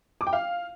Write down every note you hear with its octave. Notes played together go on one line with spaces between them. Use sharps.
D6
G5
F5